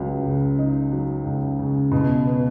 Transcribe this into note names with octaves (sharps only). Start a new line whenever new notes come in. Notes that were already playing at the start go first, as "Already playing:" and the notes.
Already playing: C#2 F#3
C#3
D#4
F#3
C#2
C#3
B2
B3